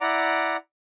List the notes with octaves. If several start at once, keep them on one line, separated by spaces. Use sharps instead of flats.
E4 D5 F#5 A#5 D6